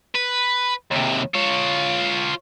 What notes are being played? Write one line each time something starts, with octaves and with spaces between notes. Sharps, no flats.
B4
D#2 C3
F4 C#5